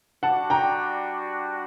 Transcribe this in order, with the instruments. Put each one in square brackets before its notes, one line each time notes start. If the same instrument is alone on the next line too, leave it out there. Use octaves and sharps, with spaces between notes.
[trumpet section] G3 D4 F#4 [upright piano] F#5 A5
[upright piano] G5 A#5